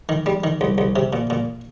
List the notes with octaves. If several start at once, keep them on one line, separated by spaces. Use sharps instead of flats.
D#3
G3
D#3
C2
C2
C3
A#2
A#2